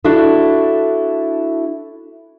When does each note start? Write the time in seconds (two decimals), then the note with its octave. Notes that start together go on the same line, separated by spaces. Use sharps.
0.04 D4 E4 F#4 A4